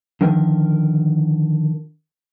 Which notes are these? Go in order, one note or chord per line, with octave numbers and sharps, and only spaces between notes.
D3 D#3 F3 A#4